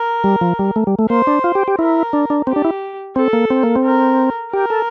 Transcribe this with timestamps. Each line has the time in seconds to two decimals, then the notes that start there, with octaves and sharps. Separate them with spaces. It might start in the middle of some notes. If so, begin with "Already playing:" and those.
Already playing: A#4
0.24 G3
0.41 F3
0.59 G3
0.76 A3
0.87 G3
0.99 A3
1.09 A#3 C5
1.27 D4
1.44 F4
1.55 G4
1.68 G4
1.79 E4 A#4
2.13 D4
2.30 D4
2.47 C4 G4
2.56 D4
2.65 E4
3.16 C4 A4
3.33 A#3
3.50 C4
3.63 A#3
3.76 C4
3.85 A#4
4.54 G4 A#4
4.70 A4